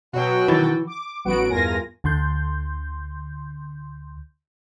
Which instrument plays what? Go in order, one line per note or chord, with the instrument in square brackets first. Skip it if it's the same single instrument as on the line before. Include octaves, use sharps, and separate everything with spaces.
[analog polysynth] B2 F#3 [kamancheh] F#4 G5
[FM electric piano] D#3 A6 [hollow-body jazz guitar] E3
[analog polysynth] D6
A1 F#3 B3 F#4 F#5 D7
E2 G2 F4 A#4 G#5 A#6
[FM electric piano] D2 D3 C6 G6